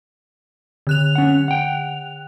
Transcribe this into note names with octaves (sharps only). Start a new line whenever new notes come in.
D3 F#6 F7
C#4 F#5
F#5 G5